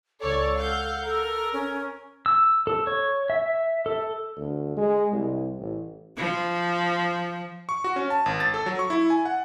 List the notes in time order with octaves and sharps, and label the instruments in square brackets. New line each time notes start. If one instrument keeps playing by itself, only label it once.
[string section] C#2 C#5 D5 [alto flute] A4
[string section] F5 F#5 G6
[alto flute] A4 [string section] A#4
[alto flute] C#4
[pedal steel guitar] E6
A4
C#5
E5
A4
[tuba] D2
G#3
C2
A1
[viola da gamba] F3
[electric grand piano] C#6
F#4
C#4
A5
G#1
A6
A4
F#3
C#6
E4
G#5
F#5